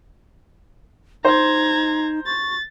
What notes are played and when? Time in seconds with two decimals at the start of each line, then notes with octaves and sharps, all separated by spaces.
1.25 D#4 C5 A#5 G#6
2.26 C#6 A6